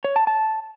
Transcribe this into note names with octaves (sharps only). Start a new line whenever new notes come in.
C#5
A5
A5